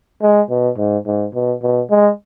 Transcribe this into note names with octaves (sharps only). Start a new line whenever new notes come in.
G#3
B2
G#2
G#2
B2
B2
G#3